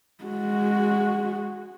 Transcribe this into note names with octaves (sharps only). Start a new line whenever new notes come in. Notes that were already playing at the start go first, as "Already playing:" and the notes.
G#3 F#4